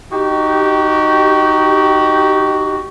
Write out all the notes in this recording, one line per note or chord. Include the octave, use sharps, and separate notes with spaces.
D#4 F#4 G4